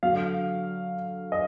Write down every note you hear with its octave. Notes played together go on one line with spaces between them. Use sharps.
D3 F#3 F5
D#5